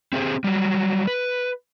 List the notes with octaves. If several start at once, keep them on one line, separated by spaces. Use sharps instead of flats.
C4 G4 G#4 C5
F#3 G3
B4